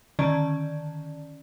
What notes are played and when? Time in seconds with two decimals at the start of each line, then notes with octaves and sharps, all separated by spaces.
0.19 D3 D#3 C#4 D5